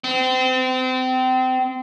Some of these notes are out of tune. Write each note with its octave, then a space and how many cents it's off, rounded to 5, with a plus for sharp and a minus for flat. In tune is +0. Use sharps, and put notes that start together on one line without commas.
C4 -30